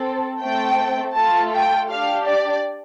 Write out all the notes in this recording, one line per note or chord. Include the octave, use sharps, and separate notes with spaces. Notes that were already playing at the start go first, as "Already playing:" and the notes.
Already playing: C4 A4
A3 C4 A4 G5
A3 F4 A4 A5
G5
D4 G4 F5
D5